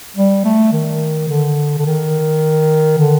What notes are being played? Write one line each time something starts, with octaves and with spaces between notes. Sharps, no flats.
G3
A3
D#3
D3
D3
D#3
D3